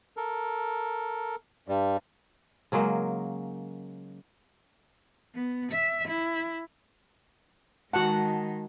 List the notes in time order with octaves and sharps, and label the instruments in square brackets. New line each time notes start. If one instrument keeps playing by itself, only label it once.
[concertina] A4 A#4
[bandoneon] G2 G3
[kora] C#3 F#3 G#3 A#3
[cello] B3
E5
E4
[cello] D#3 G#3 [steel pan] F#4 F#5 [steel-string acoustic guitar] A5